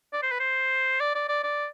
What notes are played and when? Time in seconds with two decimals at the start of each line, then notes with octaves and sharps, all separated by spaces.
0.13 D5
0.23 C5
0.31 B4
0.40 C5
1.00 D5
1.15 D5
1.29 D5
1.44 D5